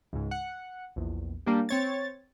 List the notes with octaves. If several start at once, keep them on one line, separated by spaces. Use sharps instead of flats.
C#2 G#2
F#5
A#1 E2
G3 A#3 D4 G4
C4 C#5 A6